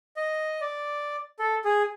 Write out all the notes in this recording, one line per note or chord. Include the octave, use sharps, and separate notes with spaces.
D#5
D5
A4
G#4